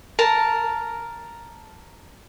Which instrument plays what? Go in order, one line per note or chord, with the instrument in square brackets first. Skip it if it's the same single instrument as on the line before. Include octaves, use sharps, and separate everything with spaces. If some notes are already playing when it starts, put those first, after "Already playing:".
[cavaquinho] A#4 A5